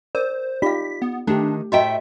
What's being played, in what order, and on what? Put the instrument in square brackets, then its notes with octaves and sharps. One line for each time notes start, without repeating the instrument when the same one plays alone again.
[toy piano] A#4 [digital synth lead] C5 [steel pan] D5
[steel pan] D#4 G4 D5 [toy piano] F4 F5 [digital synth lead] B6
[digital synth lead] B3
[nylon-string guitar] D#3 [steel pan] A3 G4 [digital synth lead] D4
[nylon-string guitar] A2 A4 G5 [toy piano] F#4 D#5 A#5 [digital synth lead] E5